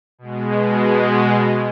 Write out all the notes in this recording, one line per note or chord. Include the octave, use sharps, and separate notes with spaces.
B2 G#3